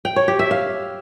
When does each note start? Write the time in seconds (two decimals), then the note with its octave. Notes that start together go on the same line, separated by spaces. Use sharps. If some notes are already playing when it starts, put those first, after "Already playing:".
0.05 G5
0.16 C#5
0.28 G4
0.39 E5
0.51 F5